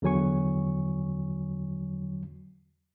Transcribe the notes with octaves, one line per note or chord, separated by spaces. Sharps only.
E2 D3 F#3 G#5 C#6